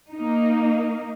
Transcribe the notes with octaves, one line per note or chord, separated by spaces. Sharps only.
A#3 D#4